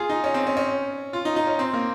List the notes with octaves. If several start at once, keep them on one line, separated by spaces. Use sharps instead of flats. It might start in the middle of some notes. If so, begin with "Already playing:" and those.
Already playing: F4 G#4
D#4
C#4
C4
C#4
C#4
F4
D#4
D#4
C#4
C4
A#3